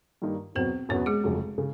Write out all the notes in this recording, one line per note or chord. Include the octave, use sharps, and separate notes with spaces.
G2 D#3 G3 A#3 D#4
E2 B2 F#3 B3 C4 C5
E2 B2 F#3 B3 C#4 C#5
G#3 G#4
F1 F2 C#3 F#3
C#3